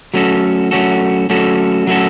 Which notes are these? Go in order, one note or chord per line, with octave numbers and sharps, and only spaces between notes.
F#3 A3 C#4 F#4 A4
F#3 A3 C#4 F#4 A4
F#3 A3 C#4 F#4 A4
F#3 A3 C#4 F#4 A4